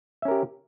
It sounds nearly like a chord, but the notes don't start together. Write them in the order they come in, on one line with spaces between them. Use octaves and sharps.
E5 C#4 A#4 G4